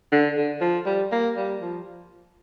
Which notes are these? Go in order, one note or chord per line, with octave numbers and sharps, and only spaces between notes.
D3
D3
F3
G3
A#3
G3
F3